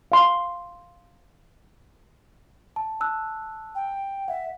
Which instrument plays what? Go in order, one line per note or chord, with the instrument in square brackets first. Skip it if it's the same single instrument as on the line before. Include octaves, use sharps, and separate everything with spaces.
[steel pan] F5 C6
[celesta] A5
A5 E6 F#6
[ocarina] G5
[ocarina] E5 [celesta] F#5